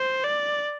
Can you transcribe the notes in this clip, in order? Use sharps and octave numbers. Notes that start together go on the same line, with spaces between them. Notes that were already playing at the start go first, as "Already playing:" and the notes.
Already playing: C5
D5